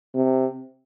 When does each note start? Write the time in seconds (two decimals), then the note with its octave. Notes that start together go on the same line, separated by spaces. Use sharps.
0.15 C3